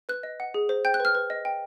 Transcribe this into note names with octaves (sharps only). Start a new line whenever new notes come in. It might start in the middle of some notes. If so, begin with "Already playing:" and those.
B4 F#6
D#5
F#5
G#4
C5
G5 G6
F#6
B4 F6
B4
D#5
G5